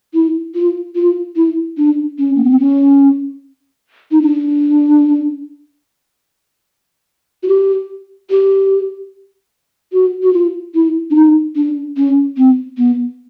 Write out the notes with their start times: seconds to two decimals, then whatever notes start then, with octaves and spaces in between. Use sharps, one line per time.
0.14 E4
0.55 F4
0.96 F4
1.36 E4
1.78 D4
2.19 C#4
2.36 A#3
2.44 B3
2.51 C4
2.59 C#4
4.11 D#4
4.22 D4
7.43 F#4
7.48 G4
8.30 G4
9.93 F#4
10.23 F#4
10.33 F4
10.75 E4
11.11 D4
11.16 D#4
11.56 D4
11.97 C#4
12.37 C4
12.78 B3